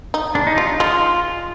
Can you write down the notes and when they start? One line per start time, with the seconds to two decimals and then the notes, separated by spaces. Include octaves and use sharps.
0.14 D#4
0.35 G#3 D4
0.47 D#4
0.57 G3 F4
0.80 G#3 F4